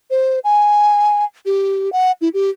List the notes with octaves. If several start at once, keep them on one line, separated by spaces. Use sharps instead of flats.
C5
G#5
G4
F#5
E4
G4